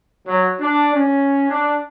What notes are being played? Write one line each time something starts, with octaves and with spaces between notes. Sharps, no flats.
F#3
D4
C#4
D4